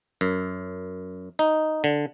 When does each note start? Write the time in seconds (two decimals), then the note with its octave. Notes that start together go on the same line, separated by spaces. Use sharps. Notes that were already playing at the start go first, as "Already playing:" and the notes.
0.21 F#2
1.39 D#4
1.84 D3